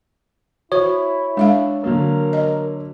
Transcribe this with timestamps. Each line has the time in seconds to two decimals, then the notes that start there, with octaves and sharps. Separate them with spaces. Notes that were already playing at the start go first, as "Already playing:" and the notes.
0.72 E4 F#4 C5 C#5
1.37 G#3 D4 A4 E5 F5
1.84 D3 F#3 A#3 A#4
2.33 D#5